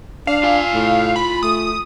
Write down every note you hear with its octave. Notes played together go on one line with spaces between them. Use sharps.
D4 F5
F4 G#5
A2
B5
A3 D#6